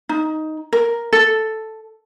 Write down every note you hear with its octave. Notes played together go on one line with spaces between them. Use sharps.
D#4
A#4
A4